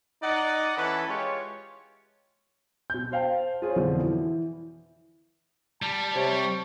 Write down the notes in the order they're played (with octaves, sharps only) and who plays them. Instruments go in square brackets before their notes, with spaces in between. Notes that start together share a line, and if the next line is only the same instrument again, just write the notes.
[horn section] D#4 D5 D#5 F#5
E3 C#4 A4 B4
G#3 F4 G4 C#5
[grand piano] B2 G6
C5 F5 G5 A5
F4 G#4 C5 C#5
F2 B2 D3 E3 F3
E3 E4
[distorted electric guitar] G3 [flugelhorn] A5
[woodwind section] C3 C#5